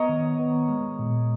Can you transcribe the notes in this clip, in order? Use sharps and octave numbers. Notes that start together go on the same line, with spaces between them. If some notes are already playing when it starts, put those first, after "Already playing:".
Already playing: B3 A#4 C#5 D#5
D#3
B3
G#3
A#2